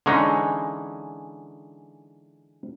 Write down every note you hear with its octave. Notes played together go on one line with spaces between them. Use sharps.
D3 E3 G#3 C#4 D#4